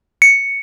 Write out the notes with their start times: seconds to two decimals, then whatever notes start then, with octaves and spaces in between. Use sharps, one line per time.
0.22 C#7